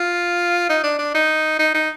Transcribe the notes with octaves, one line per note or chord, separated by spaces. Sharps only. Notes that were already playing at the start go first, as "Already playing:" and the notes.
Already playing: F4
D#4
D4
D4
D#4
D#4
D#4